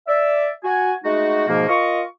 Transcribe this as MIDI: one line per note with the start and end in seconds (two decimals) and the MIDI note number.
0.08 0.49 74
0.08 0.49 76
0.64 0.92 66
0.64 0.92 80
1.04 1.44 56
1.04 1.44 57
1.04 1.44 63
1.04 1.44 66
1.48 1.66 44
1.48 1.66 47
1.48 1.66 53
1.48 1.66 58
1.68 2.02 65
1.68 2.02 70
1.68 2.02 75
1.68 2.02 85